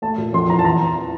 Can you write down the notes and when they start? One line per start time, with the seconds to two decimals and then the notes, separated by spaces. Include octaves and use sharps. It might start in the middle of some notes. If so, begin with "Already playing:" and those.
0.02 A3 A5
0.18 A#2
0.33 F2 C6
0.49 E3 A#5
0.59 A5
0.65 E2 A#5
0.80 E3